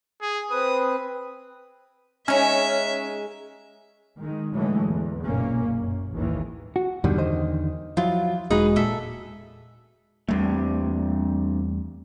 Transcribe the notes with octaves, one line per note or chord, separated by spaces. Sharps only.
G#4
C4 B4 D#6
G#3 C#4 D#4 E5
D#3 G#3
A2 D3 E3 F#3 G#3 A3
E2
F#1 B1 F#2 A#2 A#3 C#4
F#2
A1 D#2 G#2 D#3 E3
F#4
E2 G2 B2 D3 D#3 G3
C5 D#5
F3 F#3 E4 F4
E1 G#3 D#4 F#4 G#4 B4
A#2 A4 E5
E2 G2 C3 G3 A3